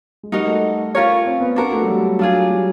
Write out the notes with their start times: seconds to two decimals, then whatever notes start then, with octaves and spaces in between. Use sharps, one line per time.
0.23 G#3
0.32 G3 D#4 F#4 A#4 D#5
0.48 A3
0.95 C#4 F4 A#4 C#5
1.25 C4
1.41 B3
1.56 A#3 D4 F#4 A#4
1.73 A3
1.82 F#3
1.88 G3
2.03 F#3
2.19 F#3 D4 F4 G#4
2.50 G3